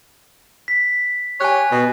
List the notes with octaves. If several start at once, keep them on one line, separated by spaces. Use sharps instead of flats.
B6
G4 C#5 G#5 F#6
B2